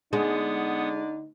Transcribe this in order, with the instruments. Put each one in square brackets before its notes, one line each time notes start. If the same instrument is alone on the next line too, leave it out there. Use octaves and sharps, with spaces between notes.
[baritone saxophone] D3 [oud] G#3 [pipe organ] B3 F#5 D#6 [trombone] D#4